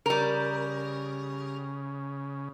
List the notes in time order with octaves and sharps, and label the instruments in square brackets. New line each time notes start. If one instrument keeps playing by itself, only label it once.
[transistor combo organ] C#3 [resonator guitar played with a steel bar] G3 A#4